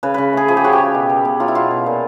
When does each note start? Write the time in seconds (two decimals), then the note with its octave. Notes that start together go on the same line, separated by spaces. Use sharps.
0.03 C#3 B4
0.14 C#3 B4
0.33 A3 G#4
0.48 F3 G#4
0.57 G4
0.64 C#3 F#4
0.73 G4
0.79 C#3
0.94 B2
1.10 B2
1.25 B3
1.40 F#3 F4
1.48 E4
1.55 B2 F4
1.71 B2
1.86 A#2